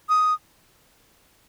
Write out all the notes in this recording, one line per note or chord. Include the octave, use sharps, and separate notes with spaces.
D#6